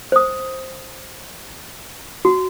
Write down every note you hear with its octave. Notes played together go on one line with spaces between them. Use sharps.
C5 D#6
F#4